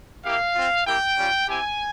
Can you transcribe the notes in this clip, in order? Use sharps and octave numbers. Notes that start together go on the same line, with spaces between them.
A#3 E4 G4 F5
C4 F4
A#3 E4 G4 G5
G3 C#4 F4
C4 E4 G4 G#5